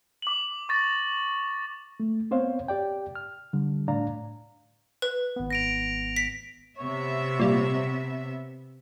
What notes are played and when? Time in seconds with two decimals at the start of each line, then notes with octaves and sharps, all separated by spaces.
0.22 D6 F#7
0.69 C#6 A6 A#6
2.00 A3
2.31 B3 C4 C5 C#5 F5
2.68 G4 D5 G5
3.15 F6
3.53 D3 G3
3.88 A2 D4 D5 F5 A#5
5.02 B4
5.36 G#1 B3
5.51 A#6 D7 F7
6.16 B6
6.78 C3 B3 C#5 E5
7.40 A#2 G3